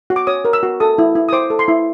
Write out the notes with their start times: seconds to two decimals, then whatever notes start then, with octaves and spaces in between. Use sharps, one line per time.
0.10 F#4
0.16 D6
0.27 C#5 D#6
0.45 A#4
0.53 E6
0.63 F#4
0.80 A4 D#6
0.98 E4
1.15 E4
1.29 D#6
1.33 C5 D6
1.50 A4
1.59 C6
1.68 E4